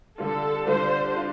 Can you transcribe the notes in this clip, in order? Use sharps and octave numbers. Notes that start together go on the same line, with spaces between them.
D3 G3 D4 F4 A4
D3 G3 D4 F4 C5
D4 F4